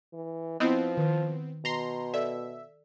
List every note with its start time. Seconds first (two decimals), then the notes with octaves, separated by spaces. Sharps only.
0.13 E3
0.60 F3 B3 C4 E4 D#5
0.97 D#3
1.65 B2 A#5 C6
2.14 A4 D5 E5